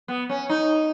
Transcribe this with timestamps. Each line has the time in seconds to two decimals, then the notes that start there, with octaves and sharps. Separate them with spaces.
0.08 B3
0.29 C#4
0.49 D#4